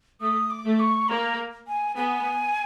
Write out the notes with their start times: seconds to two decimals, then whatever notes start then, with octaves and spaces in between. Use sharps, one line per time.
0.21 A3 D#6
0.50 D6
0.65 A3
0.79 C#6
1.08 A#3 A#5
1.67 G#5
1.96 B3 G#5